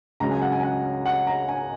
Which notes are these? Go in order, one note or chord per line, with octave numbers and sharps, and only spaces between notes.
C#2 C#3 F#3 A#5
G#5
F#5
G#5
F#5
F#5
A#5
G#5